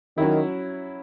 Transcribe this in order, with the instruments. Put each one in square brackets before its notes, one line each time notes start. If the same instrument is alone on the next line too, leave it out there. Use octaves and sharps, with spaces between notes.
[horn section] D#3 [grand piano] F#3 C#4 E4